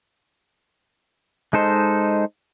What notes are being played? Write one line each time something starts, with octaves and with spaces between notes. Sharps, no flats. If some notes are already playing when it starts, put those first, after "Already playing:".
G#3 D#4 A4 C5